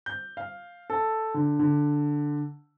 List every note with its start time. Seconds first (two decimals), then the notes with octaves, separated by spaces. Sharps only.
0.06 G6
0.37 F5
0.90 A4
1.34 D3
1.59 D3